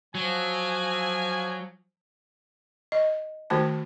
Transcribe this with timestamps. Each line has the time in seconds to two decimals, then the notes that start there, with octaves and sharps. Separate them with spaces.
0.15 F3 F#3 G#5
2.92 D#5
3.50 D#3 A3 F#4 C5 A5